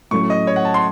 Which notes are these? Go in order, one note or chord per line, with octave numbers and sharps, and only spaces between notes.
A2 F#3 A3 C#4 C#6
D#5
C#5
F#5
A5
C6